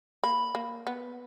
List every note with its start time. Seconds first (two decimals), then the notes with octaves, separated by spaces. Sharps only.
0.24 A#3 B5
0.55 A#3
0.87 B3